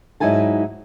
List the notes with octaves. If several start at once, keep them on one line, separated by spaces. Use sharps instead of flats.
G#2 F#3 D#4 E4 G#5 A5